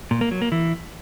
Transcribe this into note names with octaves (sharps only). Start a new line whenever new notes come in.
A#2
A#3
F#3
A#3
E3